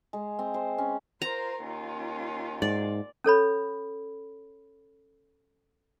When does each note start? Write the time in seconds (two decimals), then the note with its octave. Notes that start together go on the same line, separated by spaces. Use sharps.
0.13 G#3
0.39 C4
0.54 C5
0.78 C#4
1.22 F4 A#4 C5 A#5
1.62 D#2 C#4 F4
2.62 G#2 D5
3.24 C#4 A4 C#5 B5